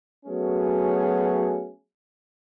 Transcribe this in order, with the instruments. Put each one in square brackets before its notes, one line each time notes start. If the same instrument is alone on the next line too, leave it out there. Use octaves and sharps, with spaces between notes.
[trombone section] F#3 A3 B3 C#4 F#4 G#4